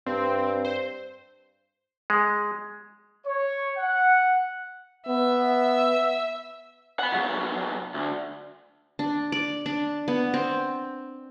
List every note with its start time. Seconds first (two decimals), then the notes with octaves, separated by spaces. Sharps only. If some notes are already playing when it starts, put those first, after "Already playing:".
0.06 G2 C4
0.65 C5
2.10 G#3
3.26 C#5
3.77 F#5
5.08 B3 E5
6.99 F#5 B5
7.11 C2 F#3
7.94 D2
8.99 D4
9.32 D5
9.66 D4
10.08 B3
10.34 C4